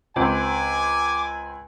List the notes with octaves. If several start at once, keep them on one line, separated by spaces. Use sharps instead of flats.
C#2 C4 G#5 D6